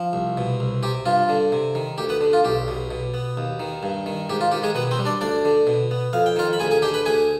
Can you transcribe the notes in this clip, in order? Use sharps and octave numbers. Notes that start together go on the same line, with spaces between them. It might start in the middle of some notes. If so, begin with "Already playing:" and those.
Already playing: F3
C2
B2
C2
C3 G4
G2 F4
D3
C3
D#3
D2 G4
B3 B4
D3
F4
B1 G4
B2
B2
B3
D#2
D#3
G2
D#3
G#2 G4
F4
D#3 G4
G#3 G#4
B2 B3 B4
C4 C5
G3
D4 D5
D2 D4 D5
D3
B2
B3
F2 F5
G5
D#3 F4 F5
B5
D2 G#4 G#5
G#4 G#5
D3 G4 G5
B4 B5
D2 G#4 G#5